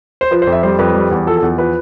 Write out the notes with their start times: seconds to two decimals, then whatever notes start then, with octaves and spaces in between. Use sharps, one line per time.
0.21 C5
0.31 F3 B4
0.42 C5
0.47 F2
0.52 E5
0.63 G3 C5
0.79 F2 B4
0.94 G3
1.11 E2
1.26 F3 A4
1.37 A4
1.42 E2
1.58 F3 B4